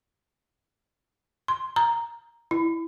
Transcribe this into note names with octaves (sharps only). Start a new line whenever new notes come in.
C6
A#5
E4